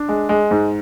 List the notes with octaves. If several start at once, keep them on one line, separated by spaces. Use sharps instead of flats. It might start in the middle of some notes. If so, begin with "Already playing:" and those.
Already playing: D4
G#3
G#3
G#2